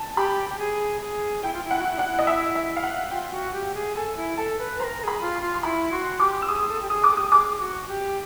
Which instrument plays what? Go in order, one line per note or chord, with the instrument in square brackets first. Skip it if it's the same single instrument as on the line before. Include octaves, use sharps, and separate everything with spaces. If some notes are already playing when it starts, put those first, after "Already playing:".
Already playing: [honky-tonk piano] A5
[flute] G4 [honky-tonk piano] B5
[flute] G4
G#4
G#4
[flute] E4 [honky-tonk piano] G5
[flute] F4
E4
[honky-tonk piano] F#5
[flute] F#4
E4
[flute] D4 E4 [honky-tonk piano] F#5
[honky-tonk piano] D#5
E5
E5
F5
F#5
[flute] F4 [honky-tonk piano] G5
[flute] F#4
G4
G#4
[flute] A4 [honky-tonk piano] G#5
[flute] E4
[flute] A4 [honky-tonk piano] A5
[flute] B4
[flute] A#4 C5 [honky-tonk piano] A#5
[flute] A#4
[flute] G#4 [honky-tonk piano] B5
[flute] F4
[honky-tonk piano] C6
[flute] F4
[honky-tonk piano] C6
[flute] E4 [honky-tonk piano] B5
[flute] F#4 [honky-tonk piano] C6
[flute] G4 [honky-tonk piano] D6
[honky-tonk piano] E6
[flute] G#4 [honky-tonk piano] D#6
[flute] A4
G4
[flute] G#4 [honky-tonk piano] D#6
[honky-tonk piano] D6
[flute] A4
[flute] G4 [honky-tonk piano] D#6
[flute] G#4 [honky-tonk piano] D6
[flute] F#4
G4